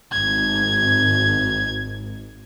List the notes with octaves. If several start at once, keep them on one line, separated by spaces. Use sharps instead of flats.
G#1 G#6